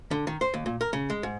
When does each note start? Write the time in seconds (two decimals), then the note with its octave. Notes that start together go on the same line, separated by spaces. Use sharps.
0.11 D3
0.27 D#3
0.41 C5
0.54 D#2
0.66 A#2
0.81 A#4
0.93 C#3
1.10 G#3
1.23 G#2